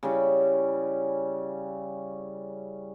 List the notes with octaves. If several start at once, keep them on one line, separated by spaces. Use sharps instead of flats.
C#3 G3 C#4 E4